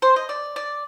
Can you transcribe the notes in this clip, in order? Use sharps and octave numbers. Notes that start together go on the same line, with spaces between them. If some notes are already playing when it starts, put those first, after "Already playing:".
C5
D#5
D5
D5